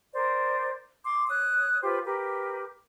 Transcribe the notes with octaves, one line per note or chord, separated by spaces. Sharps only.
A#4 C5 D5
C6 D6
C#5 D#6 F#6
F4 G4 B4 C5
G4 A#4 B4